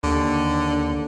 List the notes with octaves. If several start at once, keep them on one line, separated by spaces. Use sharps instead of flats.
D#2 D3